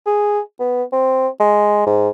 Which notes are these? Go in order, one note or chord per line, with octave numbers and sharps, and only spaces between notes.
G#4
B3
C4
G#3
G#2